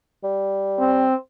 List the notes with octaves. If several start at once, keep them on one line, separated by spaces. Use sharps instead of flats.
G3
C4